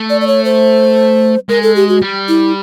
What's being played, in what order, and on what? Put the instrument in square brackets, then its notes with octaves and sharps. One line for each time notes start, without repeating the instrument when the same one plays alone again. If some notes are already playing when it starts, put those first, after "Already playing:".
Already playing: [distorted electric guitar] A3
[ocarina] D5
D5
C#5
C5
[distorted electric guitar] G#3 [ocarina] A#4
[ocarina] A4
G4
F#4
[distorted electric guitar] G3
[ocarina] E4